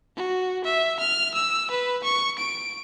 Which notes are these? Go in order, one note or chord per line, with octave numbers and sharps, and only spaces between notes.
F#4
E5
F6
E6
B4
C#6
D7